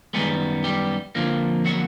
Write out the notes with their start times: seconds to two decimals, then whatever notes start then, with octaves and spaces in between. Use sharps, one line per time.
0.14 F#2 D#3 G3 G#3 B3 G#4
0.64 G3 G4
1.15 F2 D3 F3 A#3
1.65 F#3 F#4